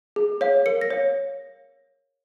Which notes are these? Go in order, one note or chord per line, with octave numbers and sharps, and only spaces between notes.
G#4
C#5 F5
A#4 C#7
A#6
C#5 F5